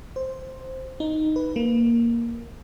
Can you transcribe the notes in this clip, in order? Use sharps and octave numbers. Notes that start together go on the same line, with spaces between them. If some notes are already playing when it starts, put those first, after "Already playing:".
C5
D#4
B4
A#3